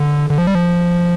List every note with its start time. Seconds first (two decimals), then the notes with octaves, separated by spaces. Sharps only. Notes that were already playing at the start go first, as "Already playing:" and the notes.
Already playing: D3
0.30 D3
0.38 F3
0.47 G3
0.55 F3